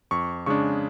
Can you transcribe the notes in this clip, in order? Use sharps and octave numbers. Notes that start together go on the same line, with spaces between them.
F2 C#6
C#3 G#3 D4 C#6